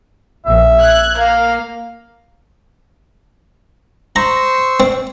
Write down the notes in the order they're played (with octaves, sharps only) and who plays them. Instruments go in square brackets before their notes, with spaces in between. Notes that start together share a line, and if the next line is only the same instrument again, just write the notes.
[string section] A#1 [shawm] E5
[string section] F#6 G#6
[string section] A#3 [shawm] F5
[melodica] C5 C#6 E6 [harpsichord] A#5
[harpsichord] C4